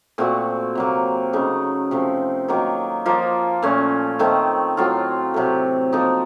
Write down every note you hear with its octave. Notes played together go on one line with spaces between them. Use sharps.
A#2 A3 C4 F#4
C3 F#3 A#3
C#3 A3 D#4
C3 F3 A3
D#3 F#3 A#3
F3 A#3 F4
A#2 A3 C#4
D#3 A3 C4
A2 F#3 C4 F4
C3 F#3 A3
F3 A#3 D#4 A4